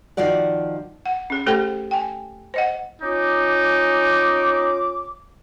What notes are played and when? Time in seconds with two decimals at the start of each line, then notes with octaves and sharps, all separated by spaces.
0.17 D#3 F3 F#4 D5 F#5
1.06 F#5
1.30 C#4 G#4
1.46 A3 G4 A4 C5 G5
1.91 G5 G#5
2.54 C5 D#5 F#5
3.02 C#4 D#4 F4 D6